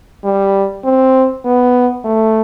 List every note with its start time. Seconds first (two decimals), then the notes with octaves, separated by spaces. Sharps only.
0.24 G3
0.84 C4
1.45 B3
2.05 A3